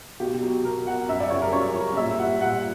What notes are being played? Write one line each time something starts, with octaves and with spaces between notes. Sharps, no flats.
B2 G4
F#3
B2 A#4
F#3 F#5
F#2 E5
D5
C#3 G3 C#5
A#4
F#2 C#5
C#3 G3
A#2 E5
G3 F#5
A#2 F#5